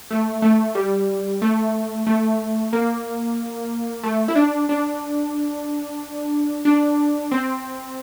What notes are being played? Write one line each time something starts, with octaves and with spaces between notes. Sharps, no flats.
A3
A3
G3
A3
A3
A#3
A3
E4
D4
D4
D4
C4